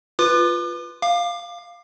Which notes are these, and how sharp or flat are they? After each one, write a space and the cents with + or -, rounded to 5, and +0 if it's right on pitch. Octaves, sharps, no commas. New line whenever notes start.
F4 +0 B4 +0 D6 +40
F5 +0 D6 +30